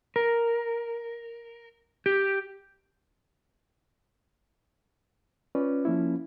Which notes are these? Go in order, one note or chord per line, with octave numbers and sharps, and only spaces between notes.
A#4
G4
C#4 F4 B4 D5
F3 A#3 C#4 E4